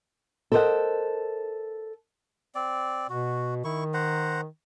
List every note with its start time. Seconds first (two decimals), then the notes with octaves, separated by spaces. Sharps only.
0.52 A4 A#4 C5 C#5 D#5 F#5
2.55 C4 D5
3.10 B2 F#4
3.64 D#3 E4 C#6
3.94 C5 F#5 A#5